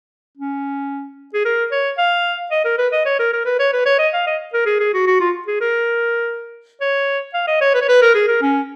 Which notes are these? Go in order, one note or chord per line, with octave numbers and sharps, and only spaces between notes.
C#4
G#4
A#4
C#5
F5
D#5
A#4
B4
D#5
C#5
A#4
A#4
B4
C#5
B4
C#5
D#5
F5
D#5
A#4
G#4
G#4
F#4
F#4
F4
G#4
A#4
C#5
F5
D#5
C#5
B4
C#5
B4
A#4
G#4
A#4
C#4